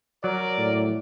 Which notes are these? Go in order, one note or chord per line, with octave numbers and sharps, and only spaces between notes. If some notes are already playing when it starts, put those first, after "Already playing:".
F#3 A#4 D5
A2